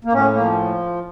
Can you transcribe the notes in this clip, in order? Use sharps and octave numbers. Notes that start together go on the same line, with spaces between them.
A#3
A2 C#4
A#3
F3